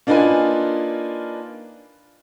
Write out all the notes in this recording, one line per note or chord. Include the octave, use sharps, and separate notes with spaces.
A#3 D4 D#4 F4 B4 G#5